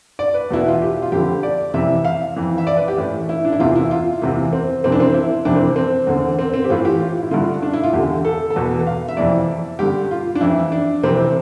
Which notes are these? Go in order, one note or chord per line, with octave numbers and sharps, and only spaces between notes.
D5
B4
E2 B2 E4
F4
G4
F4
F2 D3 G4
D5
F2 C3 E3 E5
F5
F2 E3
E5
D5
B4
G4
A2 E3
E4
D4
E4
E2 C3 E3 F4
E4
F4
E2 C3 E3
C4
F2 C3 E3 C4
D4
C4
E4
F2 C3 E3 D4
C4
C4
E2 D3
C4
C4
G4
A2 E3 F4
G4
F4
E4
G2 D3 F4
D4
E4
F4
E2 D3 G4
A4
A4
E2 B2 B4
F5
E5
F2 C3 E3 D5
G2 D3 G4
F4
D4
F2 E3 E4
D4
F2 C3 E3 C4